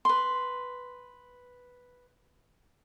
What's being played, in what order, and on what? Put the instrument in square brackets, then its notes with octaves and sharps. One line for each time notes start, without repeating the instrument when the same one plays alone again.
[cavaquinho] B4 C6